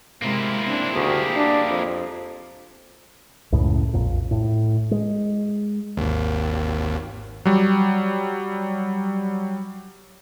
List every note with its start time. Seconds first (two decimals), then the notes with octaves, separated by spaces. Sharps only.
0.22 C3 G#3 A#3 E4
0.64 C4 D4
0.94 D2 G4 G#4
1.36 D4
1.69 F2
3.52 C#2 F#2 A2 C#3
3.94 A#1 F2 A#2
4.31 A2
4.91 G#3
5.97 G#1 D#2
7.45 F#3 G3